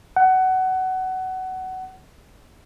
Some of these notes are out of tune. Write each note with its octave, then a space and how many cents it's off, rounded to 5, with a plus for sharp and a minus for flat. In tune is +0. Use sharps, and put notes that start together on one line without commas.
F#5 +20